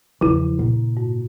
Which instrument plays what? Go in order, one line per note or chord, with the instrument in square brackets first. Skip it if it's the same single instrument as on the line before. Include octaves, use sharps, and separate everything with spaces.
[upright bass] E2 F3 [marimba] C#3 E4
[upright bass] A#2
[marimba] G#2